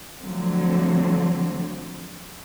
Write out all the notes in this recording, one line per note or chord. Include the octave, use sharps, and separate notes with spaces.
D3 F3 F#3 A3 C4